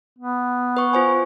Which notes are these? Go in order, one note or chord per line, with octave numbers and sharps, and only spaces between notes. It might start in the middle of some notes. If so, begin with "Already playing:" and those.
B3
B4 C#6
F4 C5 G#5